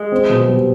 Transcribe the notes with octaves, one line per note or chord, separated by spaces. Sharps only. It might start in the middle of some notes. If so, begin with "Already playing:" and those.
Already playing: G#3
C4
B2
G3